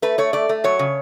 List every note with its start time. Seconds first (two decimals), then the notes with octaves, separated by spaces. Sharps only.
0.02 A3 B4
0.18 A3 C#5
0.33 A3 D5
0.49 A3
0.64 F#3 C#5
0.79 C#3